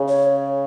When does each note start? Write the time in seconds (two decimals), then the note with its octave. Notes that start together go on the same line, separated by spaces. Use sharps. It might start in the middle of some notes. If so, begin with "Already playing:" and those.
Already playing: C#3
0.09 C#5